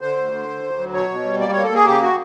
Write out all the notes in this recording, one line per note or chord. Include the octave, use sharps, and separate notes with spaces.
D3 C5
D2
D3
D2
D2
F#3
B2 C#5
B2
G3
A#3 D5
A#3 C#5
A4
A#3 G#4
C#3 G4
F#4